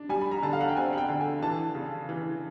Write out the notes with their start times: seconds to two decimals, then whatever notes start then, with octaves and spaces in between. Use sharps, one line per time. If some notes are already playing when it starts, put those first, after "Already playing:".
Already playing: D4
0.09 G3 G#5
0.21 B5
0.31 A#5
0.43 D3 A5
0.53 F5
0.60 F#5
0.69 G5
0.76 C4 G#5
0.93 F#5
0.98 G5
1.09 D3
1.20 G#5
1.42 E3 A5
1.75 C#3
2.09 E3